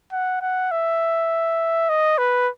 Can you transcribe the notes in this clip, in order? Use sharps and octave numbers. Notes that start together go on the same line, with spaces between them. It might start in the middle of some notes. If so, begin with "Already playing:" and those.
F#5
F#5
E5
D#5
B4